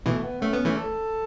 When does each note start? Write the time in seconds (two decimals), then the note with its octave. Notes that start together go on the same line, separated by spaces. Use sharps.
0.06 B2 E3 A3
0.24 B3
0.42 A3 C#4
0.53 B3
0.65 E3 A3
0.77 A4